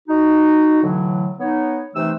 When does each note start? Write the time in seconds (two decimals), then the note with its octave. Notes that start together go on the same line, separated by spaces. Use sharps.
0.08 D#4 F#4
0.83 A2 D3 E3 F#3
1.39 B3 D#4 C#5
1.94 C3 E3 A3 D#4 C5 E6